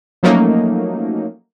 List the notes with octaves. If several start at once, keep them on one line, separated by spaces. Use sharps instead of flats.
F3 F#3 A3 A#3 C#4 D#4